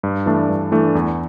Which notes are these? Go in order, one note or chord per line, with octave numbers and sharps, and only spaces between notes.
G2
E3 A3 D4
G2
E3 A3 D4
E2